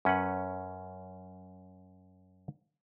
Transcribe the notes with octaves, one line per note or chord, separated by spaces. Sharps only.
F#2 C#4 B4 F#5